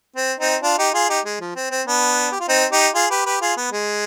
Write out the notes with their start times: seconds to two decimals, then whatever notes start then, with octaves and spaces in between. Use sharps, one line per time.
0.17 C4
0.40 C4 D#4
0.63 D4 F4
0.78 D#4 G4
0.94 F4 G#4
1.09 D#4 G4
1.25 G#3
1.41 F3
1.56 C4
1.71 C4
1.87 B3 D4
2.32 G4
2.40 F4
2.48 C4 D#4
2.72 D#4 G4
2.95 F4 G#4
3.10 G4 B4
3.26 G4 B4
3.41 F4 G#4
3.57 B3
3.72 G#3